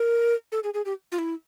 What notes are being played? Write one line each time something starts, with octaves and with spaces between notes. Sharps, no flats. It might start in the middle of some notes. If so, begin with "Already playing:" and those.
Already playing: A#4
A4
G#4
G#4
G4
F4
E4